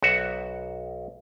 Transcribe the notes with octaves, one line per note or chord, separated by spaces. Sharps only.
B1 F#4 E5